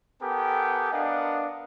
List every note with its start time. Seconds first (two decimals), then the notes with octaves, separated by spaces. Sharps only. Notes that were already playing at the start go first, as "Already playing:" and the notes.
0.22 B3 G4 A4 A#4 G5 G#5
0.92 B3 D4 A#4 D#5 F5 F#5